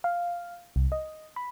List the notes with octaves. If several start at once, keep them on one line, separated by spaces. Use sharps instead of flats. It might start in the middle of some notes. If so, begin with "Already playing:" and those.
F5
C2
D#5
B5